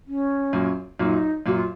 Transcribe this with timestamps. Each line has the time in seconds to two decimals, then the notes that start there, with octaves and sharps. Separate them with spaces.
0.07 C#4
0.53 F#2 A#2
0.99 F#2 A#2 D#4
1.46 F#2 A#2 F#4
1.54 F4